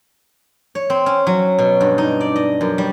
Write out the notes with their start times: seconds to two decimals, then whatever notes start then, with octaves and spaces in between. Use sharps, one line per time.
0.75 C#5
0.90 C4
1.06 C#4
1.27 F#3
1.59 B2
1.81 G2
1.98 D#4
2.21 D5
2.36 D#5
2.61 F#2
2.78 G3